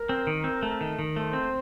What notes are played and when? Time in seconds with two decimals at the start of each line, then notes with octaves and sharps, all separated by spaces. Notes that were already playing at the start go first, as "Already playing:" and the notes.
Already playing: A#4
0.09 C4
0.27 D#3
0.44 C4
0.63 A3
0.81 D#3
0.99 D#3
1.16 A3 C5
1.33 C4